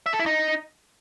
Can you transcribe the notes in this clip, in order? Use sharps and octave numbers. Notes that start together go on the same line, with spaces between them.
E5
A4
E4
D#4